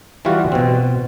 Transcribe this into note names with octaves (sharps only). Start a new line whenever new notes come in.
E3 G3 F4 F#4
B2 C4